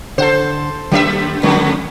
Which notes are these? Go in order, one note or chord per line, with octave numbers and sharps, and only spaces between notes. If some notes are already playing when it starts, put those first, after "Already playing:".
D3 A4 C5 F#5
F#2 D#3 G3 A#3 E4 E5
F2 D3 D#3 G3 A3